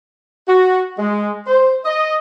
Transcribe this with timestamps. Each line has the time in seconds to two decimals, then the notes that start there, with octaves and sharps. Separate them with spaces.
0.47 F#4
0.99 G#3
1.46 C5
1.85 D#5